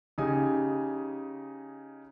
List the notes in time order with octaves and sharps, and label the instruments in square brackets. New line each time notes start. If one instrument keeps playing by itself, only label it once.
[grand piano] C#3 D#4 G4 G#5 D#6